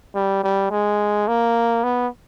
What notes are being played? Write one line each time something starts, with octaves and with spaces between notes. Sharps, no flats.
G3
G3
G#3
A#3
B3